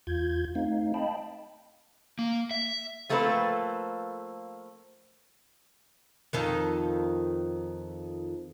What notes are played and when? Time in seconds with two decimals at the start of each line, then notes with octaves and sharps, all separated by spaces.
0.07 E2 F4 G6 G#6
0.55 A3 C4 D#4 F5
0.94 D#5 F5 G5 A5 B5
2.19 A#3
2.51 E5
3.10 F3 A3 A#3 C4 A4 B4
6.33 F2 D#3 A4